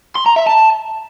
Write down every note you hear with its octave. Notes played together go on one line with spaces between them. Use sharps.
C6
A#5
E5
A5